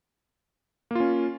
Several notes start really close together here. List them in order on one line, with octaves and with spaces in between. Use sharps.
A#3 F4 C#4